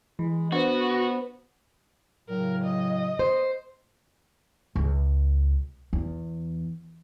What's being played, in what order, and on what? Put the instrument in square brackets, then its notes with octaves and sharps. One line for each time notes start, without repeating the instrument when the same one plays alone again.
[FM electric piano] E3 [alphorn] G#3
[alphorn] B3 [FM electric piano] D4 C5 [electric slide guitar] F#4
[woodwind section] A2 C#3 F#3 [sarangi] A#4
[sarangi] D#5
[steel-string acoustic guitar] C5
[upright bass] C#2
E2